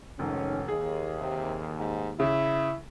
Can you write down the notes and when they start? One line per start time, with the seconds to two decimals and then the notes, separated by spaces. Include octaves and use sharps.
0.19 F1 G#2 D#3 C#4
0.68 D#2 G#4
1.20 C3
1.79 G#2
2.20 C#3 E4